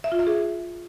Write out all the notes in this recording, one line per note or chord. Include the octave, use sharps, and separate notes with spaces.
E5
F4
E5
G#4